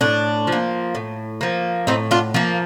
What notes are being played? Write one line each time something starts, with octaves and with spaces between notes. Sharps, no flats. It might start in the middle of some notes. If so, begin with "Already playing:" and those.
A2 D4
F3
A#3
A2
F3 A#3
A2 C4 D#4
D4 F4
F3 A#3